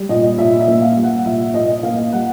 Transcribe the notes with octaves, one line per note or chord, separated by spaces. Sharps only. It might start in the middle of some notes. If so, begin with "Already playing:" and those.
Already playing: G3
A#2 D#5
A#2 E5
E5
A#3
F5
G3
F#5
A#2 E5
A#2 D#5
A#3 F5
G3 F#5